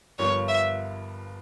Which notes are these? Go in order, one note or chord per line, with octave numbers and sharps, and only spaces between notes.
G1 G2 F3 A#3 C#5
E5